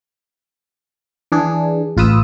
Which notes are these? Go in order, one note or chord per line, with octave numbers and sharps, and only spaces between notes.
E3 D4 G#4
A1 F4 B4 D#6 E6